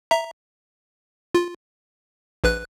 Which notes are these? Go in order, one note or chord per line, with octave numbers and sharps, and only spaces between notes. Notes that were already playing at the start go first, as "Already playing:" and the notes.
E5 A#5
F4
A#1 B4 F#6